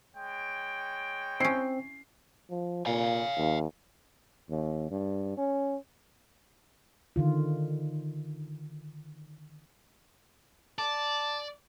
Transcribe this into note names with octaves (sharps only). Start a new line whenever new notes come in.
G#3 C#5 G5
C4 C#4 E4 C7
F3
A#2 F5 G#5
D#2
D#2
G2
C#4
D3 D#3 F4
D5 A5